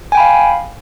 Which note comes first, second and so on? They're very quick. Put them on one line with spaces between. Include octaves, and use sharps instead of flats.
G#5 G5 B5 F5